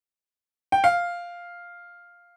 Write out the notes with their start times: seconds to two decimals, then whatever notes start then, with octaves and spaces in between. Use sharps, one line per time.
0.72 G5
0.84 F5